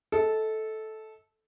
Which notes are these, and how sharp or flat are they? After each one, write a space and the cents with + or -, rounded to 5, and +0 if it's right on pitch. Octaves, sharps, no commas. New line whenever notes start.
A4 -10 D#5 +35